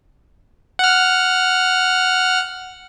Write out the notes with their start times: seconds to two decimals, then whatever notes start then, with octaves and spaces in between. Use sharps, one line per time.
0.79 F#5 F6